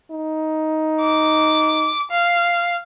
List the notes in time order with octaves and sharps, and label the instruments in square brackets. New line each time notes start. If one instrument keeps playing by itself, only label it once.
[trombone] D#4
[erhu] D6
F5